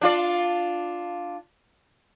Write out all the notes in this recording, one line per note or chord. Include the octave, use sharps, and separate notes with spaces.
D4 F4 D5